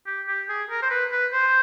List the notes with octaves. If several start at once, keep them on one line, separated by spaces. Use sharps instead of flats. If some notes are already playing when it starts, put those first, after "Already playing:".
G4
G4
G#4
A#4
C5
B4
B4
C5